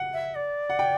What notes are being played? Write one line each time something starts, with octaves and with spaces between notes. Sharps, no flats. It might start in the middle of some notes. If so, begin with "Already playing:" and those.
Already playing: F#5
E5
D5
F#5
G5